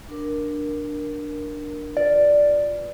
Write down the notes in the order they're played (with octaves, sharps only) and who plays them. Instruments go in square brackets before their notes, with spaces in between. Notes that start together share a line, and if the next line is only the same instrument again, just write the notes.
[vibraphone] D4 A#4
[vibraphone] F4 B4 [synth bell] D5